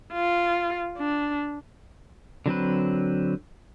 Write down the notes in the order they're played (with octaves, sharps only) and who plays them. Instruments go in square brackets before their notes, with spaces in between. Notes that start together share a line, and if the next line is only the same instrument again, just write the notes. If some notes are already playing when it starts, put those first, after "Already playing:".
[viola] F4
D4
[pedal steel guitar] D3 F#3 C4 B4